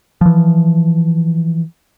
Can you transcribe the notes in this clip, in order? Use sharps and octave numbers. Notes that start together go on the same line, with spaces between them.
E3 F3